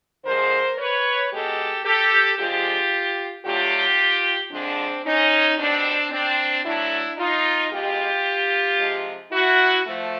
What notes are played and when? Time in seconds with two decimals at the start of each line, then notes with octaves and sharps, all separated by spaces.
0.24 D3 F3 G#3 A#4 C5
0.78 B4 C#5
1.31 B2 G#3 G4 A4
1.85 G4 A4
2.37 D3 F3 G#3 F4 G4
3.44 D3 F#3 A3 F4 G4
4.51 D3 F3 G#3 C4 D4
5.05 C#4 D#4
5.58 B2 G3 C4 D4
6.11 C4 D4
6.64 D3 F#3 A3 D4 E4
7.18 D#4 F4
7.71 B2 G#3 F4 G4
8.79 C3 F3 G#3
9.32 E4 F#4
9.85 F3 A3